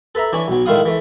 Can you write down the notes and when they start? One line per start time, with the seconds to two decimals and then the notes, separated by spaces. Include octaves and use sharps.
0.15 A4 B4 E5 A#5
0.33 E3 D4 C#5 G#5
0.48 B1 F#3
0.66 A2 D#3 G#3 E4 F5 D#6
0.86 E3 A3